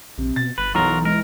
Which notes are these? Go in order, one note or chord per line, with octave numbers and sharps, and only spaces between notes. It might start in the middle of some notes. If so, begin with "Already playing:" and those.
A#1 C3
B2 A6
G1 B4
B1 E3 F#3 F4 A#4 A#5
G#3 A#4